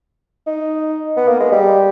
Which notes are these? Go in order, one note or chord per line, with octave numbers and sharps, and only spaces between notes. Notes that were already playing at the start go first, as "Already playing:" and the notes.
D#4
B3
A#3
G#3
G3